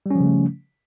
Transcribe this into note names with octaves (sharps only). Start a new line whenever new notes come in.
C#3 F3 G3 A3 C#4